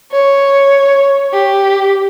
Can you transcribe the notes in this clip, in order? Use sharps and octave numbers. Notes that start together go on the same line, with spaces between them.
C#5
G4